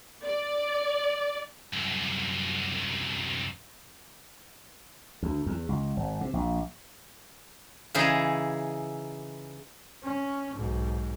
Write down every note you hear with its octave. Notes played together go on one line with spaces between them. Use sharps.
D5
C2 F#2
D2
E2
C#2
G#1
C3
A#1
C#3 E3 D#4 E4 G#4
C#4
B1 G#2